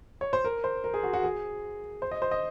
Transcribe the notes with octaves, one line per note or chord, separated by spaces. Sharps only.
C#5
C5
A#4
C5
A#4
G#4
F#4
F#4
G#4
C5
D#5
C5
D#5